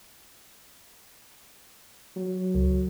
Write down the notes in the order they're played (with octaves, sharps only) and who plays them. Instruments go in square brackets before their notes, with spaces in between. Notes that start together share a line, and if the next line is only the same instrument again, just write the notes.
[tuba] F#3
[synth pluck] C#2